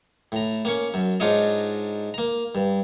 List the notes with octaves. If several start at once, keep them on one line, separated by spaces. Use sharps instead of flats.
A2 A#5
A#3 C#4 C#6
F#2
G#2 D4 D#4 F4 C#5 D#5
A#3 A#5
G2